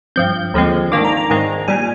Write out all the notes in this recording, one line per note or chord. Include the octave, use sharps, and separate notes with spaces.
G2 F3 C4 G6
D#2 D3 F3 G#3 C4
G#2 D#3 A#3 D4 D6
A#5
A#5
G#2 D#3 G#3 C4
A#2 G3 G#5